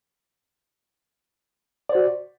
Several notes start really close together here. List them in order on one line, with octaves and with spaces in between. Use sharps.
D5 C5 F#4